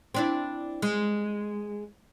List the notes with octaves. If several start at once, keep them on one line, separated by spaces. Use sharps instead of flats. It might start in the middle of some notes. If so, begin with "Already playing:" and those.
C4 D4 E4
G#3